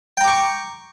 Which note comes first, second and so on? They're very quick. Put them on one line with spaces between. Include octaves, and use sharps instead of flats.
G5 A#5 D6 C#6